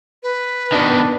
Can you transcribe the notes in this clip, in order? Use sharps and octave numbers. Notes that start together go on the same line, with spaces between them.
B4
B2 D#3 D4